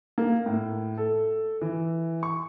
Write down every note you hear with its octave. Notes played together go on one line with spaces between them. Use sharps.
A#3
A2
A4
E3
C#6